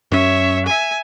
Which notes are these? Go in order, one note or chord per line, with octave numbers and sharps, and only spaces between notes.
F#2 C#4 C#5 E5
E5 G#5